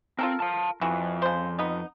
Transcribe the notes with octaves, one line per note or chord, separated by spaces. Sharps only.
C4 F4 A4 A#4
F5 A5
F2 E3 F#4
C#3 C5
B3 D#4